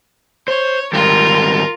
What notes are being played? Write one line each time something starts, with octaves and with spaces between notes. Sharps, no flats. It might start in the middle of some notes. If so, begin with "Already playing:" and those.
C5 C#5
G#2 D#3 G3 F4 A#4